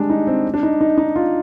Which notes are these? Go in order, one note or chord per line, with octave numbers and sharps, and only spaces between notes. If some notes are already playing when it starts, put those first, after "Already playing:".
Already playing: G3 G#3 D4
D#4
C4
D4
D#4
D#4
D#4
F4